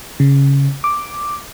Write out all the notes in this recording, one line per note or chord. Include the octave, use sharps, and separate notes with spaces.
C#3
D6